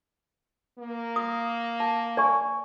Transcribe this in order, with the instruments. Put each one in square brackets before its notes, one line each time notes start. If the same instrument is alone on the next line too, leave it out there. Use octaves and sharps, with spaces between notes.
[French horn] A#3
[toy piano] D#6
A5
D5 G#5 C#6